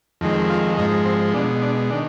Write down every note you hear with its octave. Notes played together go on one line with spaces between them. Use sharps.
F2 D#3 G#3
F4
G#2 F3 G#3 D#4
C4
B2 G#3 D4
D4
D#3 D4